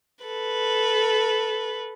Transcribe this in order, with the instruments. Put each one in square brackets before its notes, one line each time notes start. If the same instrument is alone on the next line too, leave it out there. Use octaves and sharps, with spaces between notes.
[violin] A4 B4